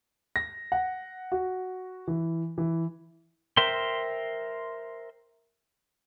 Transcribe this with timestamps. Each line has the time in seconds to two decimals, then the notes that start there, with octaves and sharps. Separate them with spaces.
0.36 A#6
0.72 F#5
1.32 F#4
2.08 E3
2.58 E3
3.57 A#4 C5 E5 G5 C6